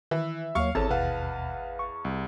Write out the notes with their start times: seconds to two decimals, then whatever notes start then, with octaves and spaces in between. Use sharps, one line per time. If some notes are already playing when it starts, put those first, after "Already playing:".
0.11 D#3 E3 E5
0.55 D#2 F#3 A#3 C#5 F5 C#6
0.75 G#1 E2 C4 A4 C#5 A5
0.90 D#2 B2 B4 F5 F#5
1.79 C#6
2.05 C2